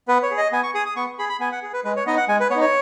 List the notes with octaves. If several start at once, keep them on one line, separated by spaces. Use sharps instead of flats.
B3 B4
C#5
G#4
D#5
B3 G#5
C#6
G#4 D#6
D#6
B3 C#6
G#4 B5
B5
B3 G#5
F#5
G#4
B4
G#3 B4
C#5
B3 D#4 D#5
F#5
G#3 G#5
B4
B3 C#5
D#4
C#5